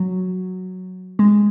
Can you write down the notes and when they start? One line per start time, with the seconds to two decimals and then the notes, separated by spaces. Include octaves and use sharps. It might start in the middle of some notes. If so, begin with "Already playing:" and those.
Already playing: F#3
1.19 G#3